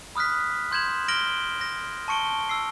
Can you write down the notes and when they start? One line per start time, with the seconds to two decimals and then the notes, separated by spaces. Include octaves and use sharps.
0.16 B5 D#6 F6 F#6 B6
0.72 C6 G6 G#6 E7 F#7
1.08 F6 A#6 D7 F#7 G7
1.61 A#6
2.08 A5 C#6 C#7 D7 G7
2.49 E6 C7